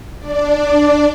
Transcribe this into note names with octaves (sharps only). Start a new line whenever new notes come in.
D4 D5